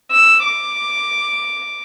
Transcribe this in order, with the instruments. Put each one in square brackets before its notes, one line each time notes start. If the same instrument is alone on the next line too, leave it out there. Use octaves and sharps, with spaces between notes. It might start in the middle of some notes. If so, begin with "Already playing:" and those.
[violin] E6
D6